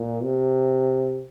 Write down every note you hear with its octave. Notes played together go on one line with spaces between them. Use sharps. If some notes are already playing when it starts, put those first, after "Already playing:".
Already playing: A#2
C3